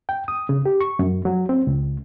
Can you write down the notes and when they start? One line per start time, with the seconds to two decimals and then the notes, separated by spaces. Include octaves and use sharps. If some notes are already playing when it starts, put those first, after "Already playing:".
0.09 G5
0.28 D#6
0.49 C#3
0.66 G4
0.81 C#6
0.99 F#2
1.25 F#3
1.49 C4
1.67 C#2